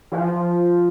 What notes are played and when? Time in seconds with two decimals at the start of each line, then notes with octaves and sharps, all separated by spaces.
0.12 E3
0.17 F3